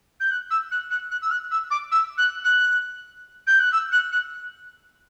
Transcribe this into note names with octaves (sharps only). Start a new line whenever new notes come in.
G6
F#6
E6
F#6
F#6
F#6
E6
F#6
E6
D6
E6
F#6
F#6
G6
F#6
E6
F#6
F#6